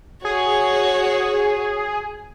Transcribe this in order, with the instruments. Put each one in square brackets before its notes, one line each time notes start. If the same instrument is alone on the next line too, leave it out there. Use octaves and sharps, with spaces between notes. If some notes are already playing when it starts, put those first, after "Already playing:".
[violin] F#4 C#5 [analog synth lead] G#4